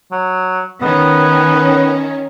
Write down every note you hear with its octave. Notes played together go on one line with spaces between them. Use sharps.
F#3
D#3 B3 C#4